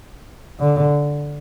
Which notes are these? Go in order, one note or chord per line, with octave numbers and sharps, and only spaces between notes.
D3